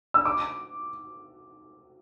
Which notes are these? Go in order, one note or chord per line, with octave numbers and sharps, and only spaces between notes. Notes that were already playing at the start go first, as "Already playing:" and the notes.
E6
D6